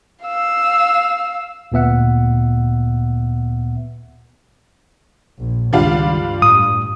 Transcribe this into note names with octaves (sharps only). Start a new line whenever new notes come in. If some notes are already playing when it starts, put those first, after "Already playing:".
F5 E6
D2 A#2 B3 E5 F#5
A#1
C#2 G2 D#3 G3 D4 F4
G2
A2 D#6